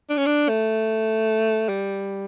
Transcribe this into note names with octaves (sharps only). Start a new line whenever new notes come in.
D4
C#4
D4
A3
G3